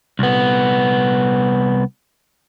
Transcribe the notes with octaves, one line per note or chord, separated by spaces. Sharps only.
C2 B3